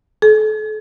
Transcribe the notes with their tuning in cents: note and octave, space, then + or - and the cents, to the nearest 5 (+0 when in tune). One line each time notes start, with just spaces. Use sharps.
A4 -40